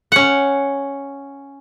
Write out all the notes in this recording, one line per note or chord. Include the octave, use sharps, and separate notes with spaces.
C#4 F#5